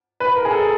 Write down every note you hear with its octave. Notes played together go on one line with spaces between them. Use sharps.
B4
A#4
G#4
A4